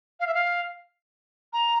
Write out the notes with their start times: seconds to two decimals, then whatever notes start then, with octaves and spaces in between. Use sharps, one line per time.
0.20 F5
0.27 E5
0.34 F5
1.53 A#5